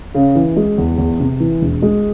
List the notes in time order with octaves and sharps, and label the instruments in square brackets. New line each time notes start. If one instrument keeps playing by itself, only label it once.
[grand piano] C#3
E3
G#3
E2
E2
C3
E3
E1
G#3